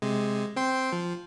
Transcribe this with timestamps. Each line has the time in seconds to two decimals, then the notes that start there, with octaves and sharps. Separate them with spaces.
0.02 C3 G#3
0.56 C4 G5 C6
0.93 F3